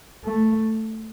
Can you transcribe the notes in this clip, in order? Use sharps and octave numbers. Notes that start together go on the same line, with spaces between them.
A3